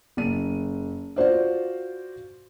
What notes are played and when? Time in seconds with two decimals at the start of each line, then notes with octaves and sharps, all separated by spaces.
0.17 F#1 D#7
1.16 F4 F#4 C5 D5